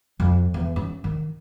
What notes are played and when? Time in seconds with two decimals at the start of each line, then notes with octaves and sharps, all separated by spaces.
0.20 F2
0.54 E2
0.76 C#4
1.04 D#3